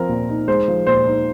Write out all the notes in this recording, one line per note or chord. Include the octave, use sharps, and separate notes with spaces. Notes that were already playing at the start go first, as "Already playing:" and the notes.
Already playing: F3 C4 A#4
A#2
D#4
G#3 C5
F3
A#2 C5
D#4